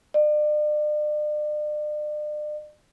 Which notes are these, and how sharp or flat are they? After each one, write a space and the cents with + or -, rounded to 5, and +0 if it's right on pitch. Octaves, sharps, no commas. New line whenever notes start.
D5 +40